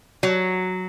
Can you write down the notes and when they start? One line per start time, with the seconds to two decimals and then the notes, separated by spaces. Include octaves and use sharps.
0.23 F#3